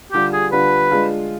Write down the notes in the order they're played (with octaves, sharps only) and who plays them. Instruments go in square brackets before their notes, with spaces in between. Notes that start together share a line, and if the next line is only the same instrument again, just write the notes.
[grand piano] D3 G3 D4 F4 [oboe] G4
[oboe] G#4
[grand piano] D3 G3 D4 F4 [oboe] B4
[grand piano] G#3 D4 F4 G#4